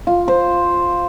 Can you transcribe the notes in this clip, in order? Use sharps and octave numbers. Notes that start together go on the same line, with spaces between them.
F4
C5